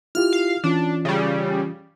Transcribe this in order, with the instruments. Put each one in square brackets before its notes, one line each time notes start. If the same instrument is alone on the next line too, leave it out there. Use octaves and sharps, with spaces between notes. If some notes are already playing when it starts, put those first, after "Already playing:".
[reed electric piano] E4 F4 G4 [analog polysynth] F6
[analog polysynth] F5
[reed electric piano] E3 C#4 F4 [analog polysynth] D4
[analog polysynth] C#3 G3